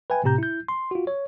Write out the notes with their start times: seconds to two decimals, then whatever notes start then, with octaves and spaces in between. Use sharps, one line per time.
0.10 B4 E5 G5 G#5
0.24 A2 C3 C4 G4 A#5 G6
0.38 E4 G6
0.68 C6
0.91 F4 F#4
1.07 C#5